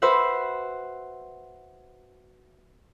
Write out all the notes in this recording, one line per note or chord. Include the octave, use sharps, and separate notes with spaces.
F#4 B4 C5 E5 F#5